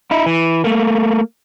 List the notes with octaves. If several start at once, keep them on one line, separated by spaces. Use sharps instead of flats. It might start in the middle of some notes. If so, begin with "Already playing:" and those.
D#4 E4
E3
A3 A#3